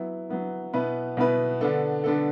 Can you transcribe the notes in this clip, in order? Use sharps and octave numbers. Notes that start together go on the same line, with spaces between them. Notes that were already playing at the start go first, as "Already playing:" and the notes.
Already playing: F#3 B3 E4
F#3 B3 E4
B2 B3 E4 B4
B2 B3 E4 B4
D3 B3 D4 A4
D3 B3 D4 A4